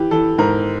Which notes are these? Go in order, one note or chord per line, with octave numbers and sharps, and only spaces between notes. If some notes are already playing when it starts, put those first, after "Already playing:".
Already playing: E3 G4
E3 A4
G#2 A#4